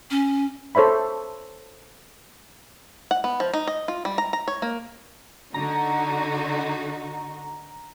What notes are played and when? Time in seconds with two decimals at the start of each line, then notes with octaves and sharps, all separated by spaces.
0.11 C#4
0.75 A4 C5 C#5 E5 B5
3.11 F#5
3.24 B3
3.40 F3
3.53 D#4
3.67 D#5
3.88 F4
4.05 G3
4.18 A#5
4.33 A#5
4.48 C#5
4.62 A#3
5.54 D3 D#4 F#4 A#5